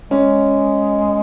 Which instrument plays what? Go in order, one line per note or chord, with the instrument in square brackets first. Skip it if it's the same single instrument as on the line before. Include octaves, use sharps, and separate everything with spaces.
[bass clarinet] G#3 [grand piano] C#4